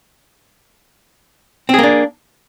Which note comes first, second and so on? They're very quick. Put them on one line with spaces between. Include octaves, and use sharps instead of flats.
C4 G#4 A#3 D4